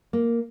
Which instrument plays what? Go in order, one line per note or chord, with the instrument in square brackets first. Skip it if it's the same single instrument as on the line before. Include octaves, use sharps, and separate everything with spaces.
[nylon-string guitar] A#3